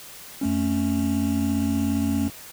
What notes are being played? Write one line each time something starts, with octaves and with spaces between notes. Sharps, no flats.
F2 A3 C#4